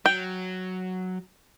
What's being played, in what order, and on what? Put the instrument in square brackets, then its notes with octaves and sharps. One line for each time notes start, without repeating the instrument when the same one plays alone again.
[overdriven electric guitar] F#3 [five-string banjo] G5